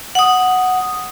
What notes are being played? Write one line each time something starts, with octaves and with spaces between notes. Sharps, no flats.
F#5 D#6